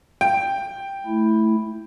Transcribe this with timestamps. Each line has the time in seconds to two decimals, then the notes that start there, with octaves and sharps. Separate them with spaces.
0.21 G5
1.06 A3 E4